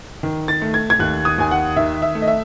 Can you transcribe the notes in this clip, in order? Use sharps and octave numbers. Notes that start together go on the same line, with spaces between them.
D#3
A6
A3
G#6
G#6
D#2 F#6
D#6
D#2 G#5
F#5
D#3 E5
E5
A3
D#5
E5